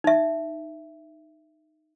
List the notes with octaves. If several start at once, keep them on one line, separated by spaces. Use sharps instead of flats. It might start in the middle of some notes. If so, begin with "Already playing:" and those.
D#4 E5